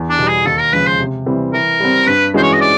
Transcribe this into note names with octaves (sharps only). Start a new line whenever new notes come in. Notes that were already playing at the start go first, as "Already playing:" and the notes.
Already playing: E2
D4
B2 G3
G#4
D#2 A4
A#4
C#3 F3 G#3 B4
C5
C3
E3 G3 C4
E3 A#4
G3 C4
G2 B4
E3 G#3 C#4 F#4 C5
C#5
D#5
D5